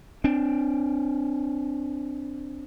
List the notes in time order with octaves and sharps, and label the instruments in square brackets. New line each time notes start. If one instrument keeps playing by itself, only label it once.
[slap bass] C4 D4